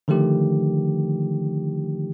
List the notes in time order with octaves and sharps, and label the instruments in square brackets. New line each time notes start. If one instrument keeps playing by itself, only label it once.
[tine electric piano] D3 D#3 F3 A3 G4